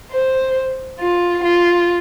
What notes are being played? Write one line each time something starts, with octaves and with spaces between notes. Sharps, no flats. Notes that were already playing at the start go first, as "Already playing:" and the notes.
C5
F4
F4